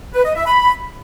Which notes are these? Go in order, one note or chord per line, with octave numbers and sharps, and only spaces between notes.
B4
D#5
E5
B5